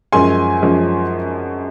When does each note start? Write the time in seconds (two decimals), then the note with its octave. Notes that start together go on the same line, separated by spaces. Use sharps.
0.12 F#2 F3 G#3 C#4 G#5 C6
0.62 F#2 F3 G#3 C#4